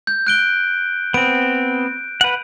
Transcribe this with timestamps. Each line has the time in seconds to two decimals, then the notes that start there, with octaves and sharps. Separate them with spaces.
0.07 G6
0.27 F#6 D7 G7
1.14 B3 C4 D7
2.21 B4 F#5